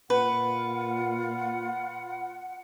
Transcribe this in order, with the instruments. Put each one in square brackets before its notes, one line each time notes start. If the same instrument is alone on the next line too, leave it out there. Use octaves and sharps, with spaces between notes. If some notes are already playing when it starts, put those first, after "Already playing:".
[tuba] A#2 [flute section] F4 F#5 [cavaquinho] B4